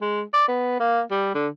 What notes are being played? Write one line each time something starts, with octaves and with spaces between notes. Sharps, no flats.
G#3
D5
B3
A#3
G3
D3